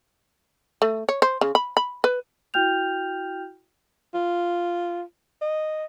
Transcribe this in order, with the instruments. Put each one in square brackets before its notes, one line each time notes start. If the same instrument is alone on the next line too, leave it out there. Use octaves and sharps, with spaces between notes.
[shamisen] A3
C#5
C5
C#3
B5
B5
B4
[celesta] E4 F#4 G5 F6 G6 F7
[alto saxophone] F4
D#5